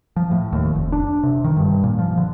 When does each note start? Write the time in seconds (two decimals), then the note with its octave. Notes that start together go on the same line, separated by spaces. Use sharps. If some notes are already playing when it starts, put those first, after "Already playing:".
0.16 F3
0.31 A2
0.53 D#2
0.75 F1
0.92 D4
1.23 C3
1.44 D#3
1.56 G2
1.84 A#2
1.99 F3
2.18 D3